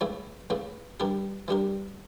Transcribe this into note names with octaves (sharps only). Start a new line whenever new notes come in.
C#2 C#3 E3 A3 E4
C#2 C#3 E3 A3 E4
E3 G3 D4 G4 A#4
E3 G3 D4 G4 A#4